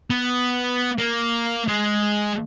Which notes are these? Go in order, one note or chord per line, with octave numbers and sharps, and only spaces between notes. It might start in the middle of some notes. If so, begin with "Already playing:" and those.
B3
A#3
G#3